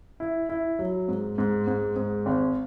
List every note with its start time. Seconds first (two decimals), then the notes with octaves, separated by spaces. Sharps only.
0.20 E4
0.49 E4
0.79 F#3
1.08 G#2
1.38 G#2
1.67 G#2
1.96 G#2
2.26 G#1